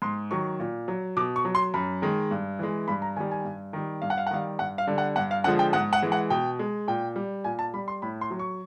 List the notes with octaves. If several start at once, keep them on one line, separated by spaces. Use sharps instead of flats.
G#2 C6
D#3 F#3 C#6
A#2
F#3
B2 D6
C#6
F#3
C6
F#2 B5
D#3 G#3
G2
E3 G#3
G2 B5
A#5
D#3 G3 G#5
G#5
G2
D#3 G3
G2 F5
F#5
F5
F#5
D#3 G3 F5
G2 F#5
F5
D3 G3
F#5
G2 F#5
F5
D3 F3 G#3 F#5
G5
G#2 F#5
F#5
E3 G#3
F#5
B2 G5
G#3
A#2 G5
G3
A#2 G#5
A5
G3 B5
C6
A2 B5
C6
F#3
C#6